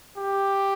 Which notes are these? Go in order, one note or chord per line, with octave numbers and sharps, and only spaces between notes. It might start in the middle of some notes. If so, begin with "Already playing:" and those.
G4